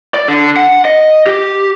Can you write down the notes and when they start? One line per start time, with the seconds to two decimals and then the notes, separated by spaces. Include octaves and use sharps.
0.14 D5
0.28 D3
0.57 F#5
0.85 D#5
1.27 G4